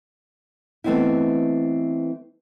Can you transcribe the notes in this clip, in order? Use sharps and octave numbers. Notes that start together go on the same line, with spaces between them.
E3 A3 B3 C4 D#4 E4